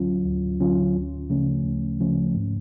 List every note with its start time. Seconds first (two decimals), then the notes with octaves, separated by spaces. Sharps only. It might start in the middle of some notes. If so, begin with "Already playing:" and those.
Already playing: D2 D3 F#3 C#4 F4
0.26 D2
0.61 D3 F#3 C#4 F4
0.96 D2
1.30 C#3 F3 A3 C#4
1.65 D2
2.00 C#3 F3 A3 C#4
2.35 G#2